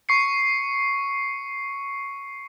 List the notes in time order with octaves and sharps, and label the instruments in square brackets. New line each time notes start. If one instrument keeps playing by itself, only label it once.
[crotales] C#6 C7 C#7